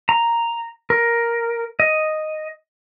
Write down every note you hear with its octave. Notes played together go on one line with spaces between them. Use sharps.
A#5
A#4
D#5